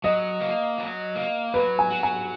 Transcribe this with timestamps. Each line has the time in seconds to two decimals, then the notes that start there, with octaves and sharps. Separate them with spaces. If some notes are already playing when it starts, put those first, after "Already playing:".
0.04 F#3 D#5
0.41 A#3
0.78 F#3
1.16 A#3
1.54 F#3 B4
1.79 G#5
1.90 F#4
2.03 G#5